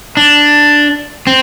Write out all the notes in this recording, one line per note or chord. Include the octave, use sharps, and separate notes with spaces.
D4
C4